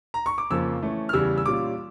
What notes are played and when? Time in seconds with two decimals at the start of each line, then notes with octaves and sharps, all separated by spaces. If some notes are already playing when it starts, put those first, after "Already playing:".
0.14 A#5
0.26 C#6
0.38 D6
0.50 F2 C#3 F3 A#3 E6
0.82 E3 A3 C#4
1.09 F6
1.13 E2 C#3 G3 E6
1.38 E6
1.46 A#2 G3 C#4 F4 D6